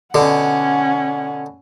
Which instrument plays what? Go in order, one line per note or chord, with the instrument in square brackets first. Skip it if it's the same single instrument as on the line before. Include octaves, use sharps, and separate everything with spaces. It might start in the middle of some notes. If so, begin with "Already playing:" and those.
[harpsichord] B2 D3 [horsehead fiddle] C#4 F#5